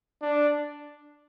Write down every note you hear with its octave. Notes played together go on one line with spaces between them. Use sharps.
D4